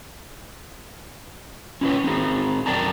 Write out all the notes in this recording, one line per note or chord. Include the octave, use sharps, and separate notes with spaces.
C#4 E4 F4 G4 B4 C#5
C4 D#4 G#4
F#2 A#4 D5 G5 A5 A#5